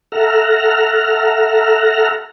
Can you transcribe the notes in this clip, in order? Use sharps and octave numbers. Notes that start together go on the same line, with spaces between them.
A4 E5 F#5 A#5 F6